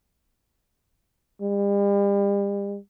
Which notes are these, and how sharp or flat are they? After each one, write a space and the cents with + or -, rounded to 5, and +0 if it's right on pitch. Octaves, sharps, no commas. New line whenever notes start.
G3 +40